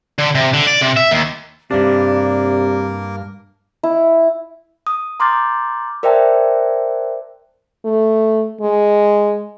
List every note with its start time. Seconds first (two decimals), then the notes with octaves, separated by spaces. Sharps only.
0.19 D3
0.35 C3
0.54 D3
0.67 D5
0.81 C3
0.96 E5
1.11 D#2
1.71 G2 C3 A#3 D4 A#4 D5
3.83 E4
4.87 D#6
5.20 A#5 C6 D6 F6 G6 A6
6.03 A#4 C5 D5 E5 G5 A5
7.85 A3
8.61 G#3